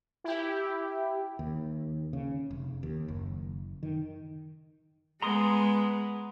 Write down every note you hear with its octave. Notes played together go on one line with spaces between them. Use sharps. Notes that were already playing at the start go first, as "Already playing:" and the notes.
E4 G4
D#2
C#3
F1
D#2
F#1
D#3
G#3 B3 A#5 C6 D#6